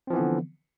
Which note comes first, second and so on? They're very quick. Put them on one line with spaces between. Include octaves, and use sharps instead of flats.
C4 F3 E3 B3 D3